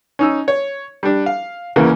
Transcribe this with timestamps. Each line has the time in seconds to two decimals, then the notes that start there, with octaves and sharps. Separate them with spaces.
0.19 C#4 D#4 E6
0.48 C#5
1.03 G3 D4
1.26 F5
1.76 E2 C#3 E3 A#3